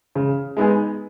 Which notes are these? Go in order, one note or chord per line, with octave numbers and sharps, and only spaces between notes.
C#3
G#3 B3 D#4 G#4